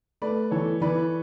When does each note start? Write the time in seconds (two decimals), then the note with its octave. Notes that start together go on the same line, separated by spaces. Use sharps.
0.22 A3 B4 D5
0.51 E3 A4 C#5
0.81 E3 B4 D5